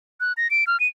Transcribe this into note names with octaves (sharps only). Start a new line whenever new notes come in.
F#6
A#6
D7
F6
D#7